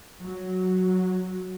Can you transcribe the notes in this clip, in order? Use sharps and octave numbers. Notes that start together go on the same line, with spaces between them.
F#3